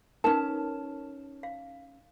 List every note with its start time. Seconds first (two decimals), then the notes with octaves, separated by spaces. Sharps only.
0.24 C#4 D#4 A#4 B4 A5
1.43 F5